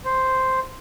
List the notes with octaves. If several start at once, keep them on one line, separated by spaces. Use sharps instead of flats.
C5